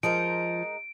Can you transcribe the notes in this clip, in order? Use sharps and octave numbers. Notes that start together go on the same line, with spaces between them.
F3 G#3 D#4 A#4 D7